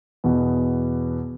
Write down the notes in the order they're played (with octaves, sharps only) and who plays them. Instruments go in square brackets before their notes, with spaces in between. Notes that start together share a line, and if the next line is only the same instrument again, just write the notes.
[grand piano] E2 B2 B3